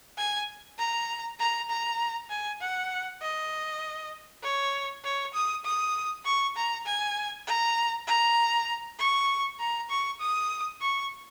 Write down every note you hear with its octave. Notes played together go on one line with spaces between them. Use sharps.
G#5
A#5
A#5
A#5
G#5
F#5
D#5
C#5
C#5
D#6
D#6
C#6
A#5
G#5
A#5
A#5
C#6
A#5
C#6
D#6
C#6